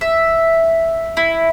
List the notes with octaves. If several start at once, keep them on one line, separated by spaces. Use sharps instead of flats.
E5
E4